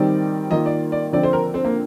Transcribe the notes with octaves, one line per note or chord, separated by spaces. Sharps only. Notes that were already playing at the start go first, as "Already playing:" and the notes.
Already playing: D#3 G3 C4 D#4 D5
D#3 A#3 F4 D#5
D5
D5
D3 F3 C4 D5
C5
A#4
C4
A#3